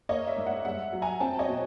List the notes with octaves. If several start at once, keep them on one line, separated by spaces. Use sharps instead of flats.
A#3 C#5 D#5
D5 E5
G#2
E5 F#5
G2 E5 F#5
F#3
G#5 A#5
C4 G5 A5
C#5 D#5
B2